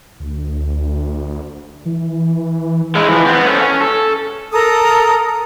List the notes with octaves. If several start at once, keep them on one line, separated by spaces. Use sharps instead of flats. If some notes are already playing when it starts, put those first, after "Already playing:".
D2
E3
G#3 E4
E3 F3
B3 C4
C#4 A4
C#4
A4
A4 A#4 A#5 D#6